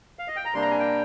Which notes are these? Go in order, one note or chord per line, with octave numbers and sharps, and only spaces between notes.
F5
D#5
G5
A#5
C3 G3 A#3 D4 C6
A#5
G#5
G5